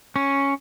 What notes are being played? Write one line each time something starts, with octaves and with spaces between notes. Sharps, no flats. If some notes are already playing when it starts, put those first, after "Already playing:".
C#4